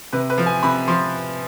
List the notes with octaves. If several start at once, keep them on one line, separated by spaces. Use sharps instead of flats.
C3 B4
B4
F3
G#5
C3 B5
F3 C6